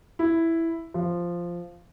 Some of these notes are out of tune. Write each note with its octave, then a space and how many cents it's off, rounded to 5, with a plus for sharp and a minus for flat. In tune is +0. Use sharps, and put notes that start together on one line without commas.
E4 +0
F3 -5